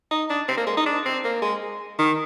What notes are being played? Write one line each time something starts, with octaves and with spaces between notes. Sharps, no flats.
D#4
D4
C4
A#3
G#3
D#4
D4
C4
A#3
G#3
D#3